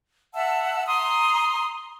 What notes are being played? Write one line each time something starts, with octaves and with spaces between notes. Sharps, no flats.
E5 F#5 A5 E6
A#5 C6 D#6